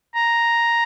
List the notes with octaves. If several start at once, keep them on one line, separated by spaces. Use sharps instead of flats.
A#5